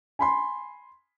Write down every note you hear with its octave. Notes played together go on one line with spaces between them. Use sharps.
G#5 B5 C6